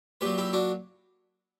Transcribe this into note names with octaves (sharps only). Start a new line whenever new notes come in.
A#2 F#3 G4 B4
E4 G4
D4 F#4